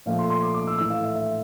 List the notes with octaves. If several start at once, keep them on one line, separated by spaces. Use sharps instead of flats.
A#2 F3 A3 F5
C6
C6
D6
D6
E6
A2 E3 A3 E6
F5
E5
E5